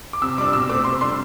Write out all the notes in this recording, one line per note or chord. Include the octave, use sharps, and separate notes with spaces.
D6
C3 E6
G3 D4 D6
B2 E6
A3 C4 D6
C3 C6
G3 D4 C6